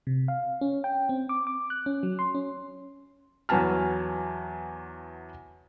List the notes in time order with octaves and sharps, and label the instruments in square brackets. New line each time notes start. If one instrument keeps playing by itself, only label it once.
[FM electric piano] C3
F5
C#4
G5
C4
D6
D6
F#6
C#4
F#3
C6
C#4
[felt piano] E2 F#3 B3 G#5 A5 F6